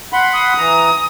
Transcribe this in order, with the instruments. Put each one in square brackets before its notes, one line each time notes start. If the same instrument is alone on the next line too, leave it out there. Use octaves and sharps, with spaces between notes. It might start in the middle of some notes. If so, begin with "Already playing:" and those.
[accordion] F#5 B5 C6
[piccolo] D#6
[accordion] E3 A#5